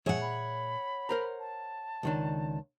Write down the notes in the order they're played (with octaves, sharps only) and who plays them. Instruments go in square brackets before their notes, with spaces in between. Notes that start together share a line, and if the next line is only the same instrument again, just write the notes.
[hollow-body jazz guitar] A#2 G#4 E5 [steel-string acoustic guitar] C#5 F#5
[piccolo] B5
[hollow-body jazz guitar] A#4 C5 A#5
[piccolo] A5
[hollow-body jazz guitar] C#2 D#3 D4